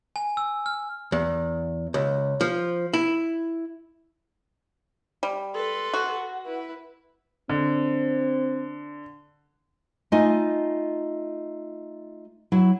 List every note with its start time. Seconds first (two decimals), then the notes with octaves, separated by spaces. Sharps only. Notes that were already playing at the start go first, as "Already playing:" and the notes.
0.16 G#5
0.37 E6
0.66 F6
1.12 E2
1.94 C#2
2.41 F3
2.93 E4
5.23 G3
5.55 A4 B4 C6
5.94 F#4
6.45 E4 B4
7.49 D3 C4
10.12 A3 D#4 F4 D#5 G#5
12.52 F#3 E4